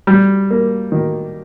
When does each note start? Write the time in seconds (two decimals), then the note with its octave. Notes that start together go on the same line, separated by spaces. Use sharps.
0.07 G3
0.50 A#3
0.92 D#3